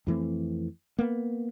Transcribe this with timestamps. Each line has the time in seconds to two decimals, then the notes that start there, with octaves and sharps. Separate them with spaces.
0.07 F2 E3 A3 C4
0.98 A#3 B3